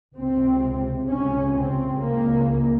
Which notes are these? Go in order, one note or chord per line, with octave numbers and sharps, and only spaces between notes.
C#2 C3 C4
C#2 C3 C#4
C4
C#2 C#3 A#3